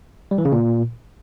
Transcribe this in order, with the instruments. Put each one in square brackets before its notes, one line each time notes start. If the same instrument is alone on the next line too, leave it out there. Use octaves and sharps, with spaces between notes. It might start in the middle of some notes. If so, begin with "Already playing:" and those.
[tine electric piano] G3
E3
C#3
A#2